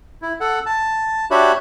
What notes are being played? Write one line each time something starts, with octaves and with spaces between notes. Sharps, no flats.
E4
A4 F#5
A5
D4 F#4 G4 C#5 E5 B5